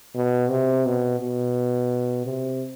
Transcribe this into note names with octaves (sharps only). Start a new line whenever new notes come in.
B2
C3
B2
B2
C3